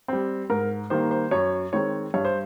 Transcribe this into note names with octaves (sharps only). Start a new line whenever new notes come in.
G3 C4
G#2 A#4
D#3 G3 A#3 C5
C5
F#2 C#5
D#3 G#3 C4 C#5
G2 C#5
C5